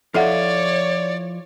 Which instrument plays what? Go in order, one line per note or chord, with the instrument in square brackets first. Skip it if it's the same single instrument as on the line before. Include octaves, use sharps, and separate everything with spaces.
[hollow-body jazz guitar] F3 E4 F4 [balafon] A4 E5 F#5 [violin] C#5 [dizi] D5